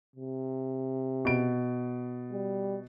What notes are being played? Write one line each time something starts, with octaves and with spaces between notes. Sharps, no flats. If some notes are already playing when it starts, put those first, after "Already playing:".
C3
B2 D7
G3